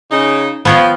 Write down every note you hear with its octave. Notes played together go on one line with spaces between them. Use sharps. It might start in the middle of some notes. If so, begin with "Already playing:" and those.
C#3 D#4
F3 B3 C#5 G5